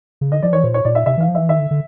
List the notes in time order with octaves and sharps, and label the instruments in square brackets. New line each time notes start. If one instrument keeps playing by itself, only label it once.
[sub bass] C#3
[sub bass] D3 [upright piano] D#5
[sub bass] F3 [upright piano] D5
[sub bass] E3 [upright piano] C#5
[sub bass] A#2 [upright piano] C5
[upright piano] C#5
[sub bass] A#2 [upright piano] D5
[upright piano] E5
[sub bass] C3 [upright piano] E5
[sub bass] E3 [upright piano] F5
[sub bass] F3
[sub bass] E3 [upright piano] E5
[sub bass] D#3 [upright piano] E5
[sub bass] D3
D3